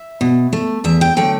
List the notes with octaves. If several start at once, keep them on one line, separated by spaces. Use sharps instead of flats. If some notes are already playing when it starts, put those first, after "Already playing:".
Already playing: E5
B2
A3
E2 E5
G5
D3 F#3 A3 G5